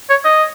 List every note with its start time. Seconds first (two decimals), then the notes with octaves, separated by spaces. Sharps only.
0.10 C#5
0.25 D#5